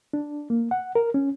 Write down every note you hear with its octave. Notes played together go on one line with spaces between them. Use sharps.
D4
A#3
F#5
A#4
C#4